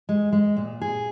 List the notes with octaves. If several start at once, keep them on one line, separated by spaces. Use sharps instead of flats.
G#3
G#3
A#2
G#4